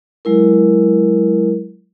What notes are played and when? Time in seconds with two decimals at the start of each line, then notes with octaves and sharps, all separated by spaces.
0.25 F#3 G#3 E4 A#4